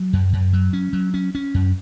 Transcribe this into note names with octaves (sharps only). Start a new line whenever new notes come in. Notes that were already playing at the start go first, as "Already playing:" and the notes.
Already playing: F#3
F#2
F#2
F#3
C#4
F#3
C#4
C#4
F#2